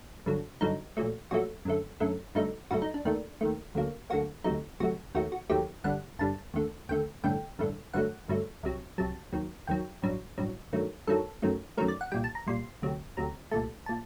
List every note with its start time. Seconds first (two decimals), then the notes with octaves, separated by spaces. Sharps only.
0.26 G1 G2 D3 F#3
0.61 G1 G2 D3 F#3 D#4
0.97 A#1 A#2 F#3 A3
1.31 A#1 A#2 F#3 A3 F#4
1.65 F#2 D3 A3
2.00 F#2 D3 A3
2.35 G2 D3 F#3 A3 D#4
2.71 G2 D3 F#3 A3 F#4
2.82 D#4
2.94 D4
3.05 D#2 D#3 A3 D4
3.41 D#2 D#3 A3
3.75 D2 D3 F#3 A#3
4.10 D2 D3 F#3 A#3 F#4
4.44 D2 C3 F#3 A3 D#4
4.80 D2 C3 F#3 A3 F#4
5.15 D#2 D#3 F#3 A3 F#4
5.32 F#4
5.49 D#2 D#3 F#3 A3 G4
5.84 G1 G2 D3 G3 F#5
6.19 G1 G2 D3 G3 A5
6.54 D#2 D3 A3
6.89 D#2 D3 A3 G5
7.24 A1 G2 D3 A3 G5
7.59 A1 G2 D3 A3
7.93 G1 G2 F#3 A3 F#5
8.28 G1 G2 F#3 A3
8.63 C2 C3 F#3
8.98 C2 C3 F#3 A5
9.33 D#2 D#3 F#3
9.67 D#2 D#3 F#3 G5
10.02 A1 G2 F#3
10.38 A1 G2 F#3
10.73 G2 D#3 F#3 A3
11.07 G2 D#3 F#3 A3 A4
11.42 F#2 D#3 F#3 A3
11.77 F#2 D#3 F#3 A3 A#4
11.88 D5
12.01 F#5
12.12 C2 A#2 G3 G5
12.24 A5
12.35 A#5
12.47 C2 A#2 G3 C6
12.82 D2 C3 F#3
13.17 D2 C3 F#3 A#5
13.51 C2 A#2 A3 A5
13.86 A#2 A5